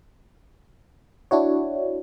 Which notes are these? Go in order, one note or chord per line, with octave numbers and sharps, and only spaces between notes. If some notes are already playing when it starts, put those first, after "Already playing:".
D4 E4 F#4 C#5